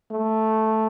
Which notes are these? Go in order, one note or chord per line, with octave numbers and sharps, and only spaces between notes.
A3